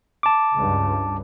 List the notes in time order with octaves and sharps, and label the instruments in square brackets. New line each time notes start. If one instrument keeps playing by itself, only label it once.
[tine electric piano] A5 D6
[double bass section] C#2 G2